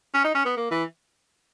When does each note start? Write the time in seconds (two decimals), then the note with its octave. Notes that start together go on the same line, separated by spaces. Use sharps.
0.14 C#4
0.24 D#4
0.34 C#4
0.45 B3
0.57 A#3
0.71 E3